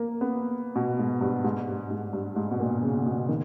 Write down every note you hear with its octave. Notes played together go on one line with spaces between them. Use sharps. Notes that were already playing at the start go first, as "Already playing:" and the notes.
Already playing: A#3
B3
B2
G#2
G2
G#2
G2
G#2
G2
G#2
B2
A#2
C#3
B2
D#3